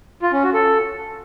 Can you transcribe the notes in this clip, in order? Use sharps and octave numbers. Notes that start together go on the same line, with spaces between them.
F4
C#4
F#4
A4